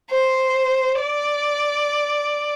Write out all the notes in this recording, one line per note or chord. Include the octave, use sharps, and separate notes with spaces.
C5
D5